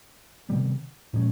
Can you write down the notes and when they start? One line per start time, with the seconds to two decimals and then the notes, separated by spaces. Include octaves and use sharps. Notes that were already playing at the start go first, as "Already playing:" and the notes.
0.49 C3 D#3 G3 B3
1.13 A#2 F3 G#3 C#4